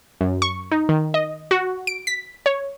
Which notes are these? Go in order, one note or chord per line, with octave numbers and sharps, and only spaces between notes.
F#2
C#6
D#4
D#3
D#5
F#4
D7
B6
C#5